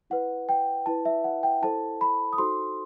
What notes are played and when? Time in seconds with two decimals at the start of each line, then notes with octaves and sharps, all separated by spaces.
0.10 E4 B4 F#5
0.49 G5
0.86 E4 B4 A5
1.05 E5
1.24 F#5
1.43 G5
1.62 E4 A4 C5 A5
2.01 B5
2.33 D#6
2.38 D#4 F#4 A4 C5 C6